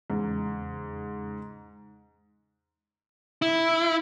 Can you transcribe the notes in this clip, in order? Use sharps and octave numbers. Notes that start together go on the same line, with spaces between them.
E2 G#2 C#3
E4